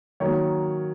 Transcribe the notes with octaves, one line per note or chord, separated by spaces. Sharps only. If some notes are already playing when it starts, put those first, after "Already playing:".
D#3 F#3 A#3 C#5